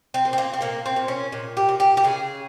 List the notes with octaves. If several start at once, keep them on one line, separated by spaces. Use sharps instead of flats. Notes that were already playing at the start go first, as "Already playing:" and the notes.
C4
A#2
C4
A#3
C4
A#2 A#3
C4
A#2
C#4
A#2
G4
A#2
G4
G4
C#3 G#4